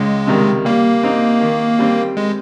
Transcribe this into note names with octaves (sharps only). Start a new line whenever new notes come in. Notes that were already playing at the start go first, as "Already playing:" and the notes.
Already playing: C#2 G#3
C3 D#3 G3
G3 A#3
C4 D#4
D#3
G3 C4
G#3